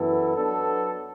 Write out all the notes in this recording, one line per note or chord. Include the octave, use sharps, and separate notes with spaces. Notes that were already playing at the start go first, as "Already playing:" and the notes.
Already playing: F#2 E3 B3 E4 A4
F#3 B3 D4 A4